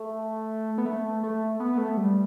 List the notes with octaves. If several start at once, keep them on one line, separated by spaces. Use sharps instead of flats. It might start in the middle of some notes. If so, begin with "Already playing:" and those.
Already playing: A3
B3
A3
A3
B3
A3
G3